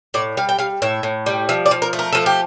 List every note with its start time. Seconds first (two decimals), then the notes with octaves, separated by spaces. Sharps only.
0.14 A2 D5
0.37 G3 F5
0.49 G5
0.58 G3 F5
0.82 A2 E5
1.03 A2
1.26 G3
1.49 F3 E5
1.66 D5
1.71 F3
1.82 A#4
1.93 A3
1.99 A#4
2.12 F3 A4
2.26 G4